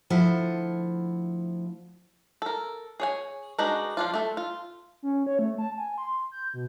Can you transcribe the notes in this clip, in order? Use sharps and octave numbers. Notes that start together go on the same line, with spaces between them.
D2 F3 E4 C5 F#5
A4 A#4
G#4 C#5 G#5
G#3 D4 D#4 F#4 B4
F3 D4 F4
A3 A4
F4
C#4
C#5
A3
A5
G#5
C6
G6
B2